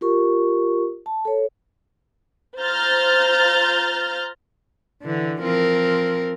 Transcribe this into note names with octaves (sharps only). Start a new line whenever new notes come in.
F4 G4 A#4 C#6
A5
A4 C#5
F4 C5 A#5 F6 G6 A6
D3 E3
F3 C4 A#4